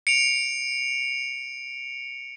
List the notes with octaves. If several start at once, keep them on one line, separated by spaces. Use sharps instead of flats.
C#7 D7 F7